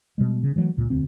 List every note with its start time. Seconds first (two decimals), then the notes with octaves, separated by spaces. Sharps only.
0.18 B2 G3 G#3
0.43 C#3
0.56 E3 F#3 G3 A3
0.77 C#2 A#2
0.90 E1 D2 C4